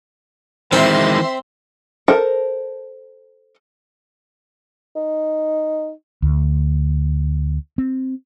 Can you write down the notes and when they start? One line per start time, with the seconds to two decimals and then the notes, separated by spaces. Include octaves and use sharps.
0.72 D#3 E3 G#3 C4 E5 C6
2.08 A4 A#4 C5 A5
4.96 D#4
6.22 D2
7.78 C4